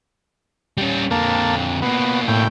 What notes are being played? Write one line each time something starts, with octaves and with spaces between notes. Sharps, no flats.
G3 C#4
F2 D3 A#3 A5
B2 A#3 B3
A2 G5